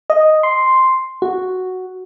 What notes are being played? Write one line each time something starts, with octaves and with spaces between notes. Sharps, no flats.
D#5
C6
F#4